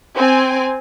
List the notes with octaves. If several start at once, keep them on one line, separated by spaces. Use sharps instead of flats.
C4 G#5